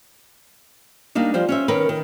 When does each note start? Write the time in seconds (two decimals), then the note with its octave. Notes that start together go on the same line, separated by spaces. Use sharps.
1.15 G3 A#3 D4 D#4
1.34 F3 G3 C5
1.49 C#4 C5 E5
1.68 D#3 C#4 A#4 B4
1.89 D#3